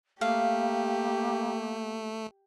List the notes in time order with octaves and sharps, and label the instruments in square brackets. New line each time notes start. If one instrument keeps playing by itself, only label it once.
[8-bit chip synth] A3 [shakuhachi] A#3 [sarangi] G4 [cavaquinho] F5